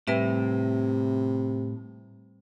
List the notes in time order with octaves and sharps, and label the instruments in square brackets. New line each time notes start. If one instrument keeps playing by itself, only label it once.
[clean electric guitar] A2 [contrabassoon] C3 [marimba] G3 B4 E5